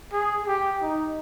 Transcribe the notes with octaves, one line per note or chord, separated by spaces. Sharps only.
G#4
G4
D#4